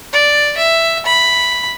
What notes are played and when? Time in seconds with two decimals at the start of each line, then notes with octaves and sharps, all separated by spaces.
0.13 D5
0.57 E5
1.06 B5